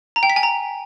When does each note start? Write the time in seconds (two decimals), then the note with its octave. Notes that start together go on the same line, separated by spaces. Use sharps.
0.16 A#5
0.23 G5
0.30 B6
0.36 G#5
0.43 A#5